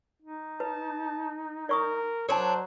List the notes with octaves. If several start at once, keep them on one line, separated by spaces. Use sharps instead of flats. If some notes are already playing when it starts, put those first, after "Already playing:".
D#4
B4 A5
A#4 D5 C#6 D#6
F#3 D4 A#4 C5 C#5 A5